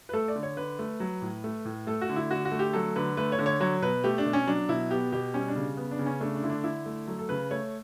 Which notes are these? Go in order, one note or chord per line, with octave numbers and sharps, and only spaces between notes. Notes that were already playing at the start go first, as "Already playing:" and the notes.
B4
A3 A4
D5
D3
C#5
D3 B4
A3
F#3
A2
A3
A2
A3 A4
F#4
D3
E4
D3 F#4
F#4
A3
G4
F#3 A4
D3 B4
A3 B4
C#5
D3
C#5
F#3 C#5
B2 B4
A3 G4
D4
B2
C#4
F#3 D4
B2 E4
B3 G4
B2 G4
G3 C#4
D4
C#3
B3
D4
C#3
C#4
A3 D4
D4
D3 E4
D4
D3 E4
A3
F#3 A4
A4
C#3 B4
A3 C#5